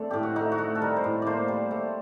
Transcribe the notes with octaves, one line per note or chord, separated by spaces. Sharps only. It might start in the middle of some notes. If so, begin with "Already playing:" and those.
Already playing: A3 C4 D4 A4
A2 G4
F#4
A3 D#4
F#4
A3
A4
G3 A#4
C5
A2
A#3 C5 D5
G3
A3